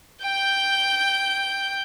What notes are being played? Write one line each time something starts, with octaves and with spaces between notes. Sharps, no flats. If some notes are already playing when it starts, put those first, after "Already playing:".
G5 G6